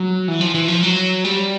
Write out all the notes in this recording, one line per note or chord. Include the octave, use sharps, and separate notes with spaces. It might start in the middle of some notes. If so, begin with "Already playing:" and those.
Already playing: F#3
E3
F3
E3
F3
F#3
G3